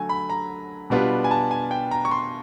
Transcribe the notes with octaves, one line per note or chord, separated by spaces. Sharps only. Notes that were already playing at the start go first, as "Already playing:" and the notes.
Already playing: D3 F#3 A3 G#5
B5
A#5
B2 G3 B3 D4 F4
G#5
A5
G#5
G5
A#5
C#6
C6